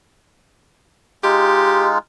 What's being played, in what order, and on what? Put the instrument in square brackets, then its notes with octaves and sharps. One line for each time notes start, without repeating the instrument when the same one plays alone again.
[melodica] G#3 D#4 F4 [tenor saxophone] G4